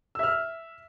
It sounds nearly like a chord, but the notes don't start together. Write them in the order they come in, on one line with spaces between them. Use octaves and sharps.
E6 E5 F6